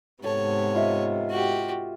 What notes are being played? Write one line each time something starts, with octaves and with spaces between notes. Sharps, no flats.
G#2 C3 B3 A4 C#5
F4 D#5 E5
F#4 G4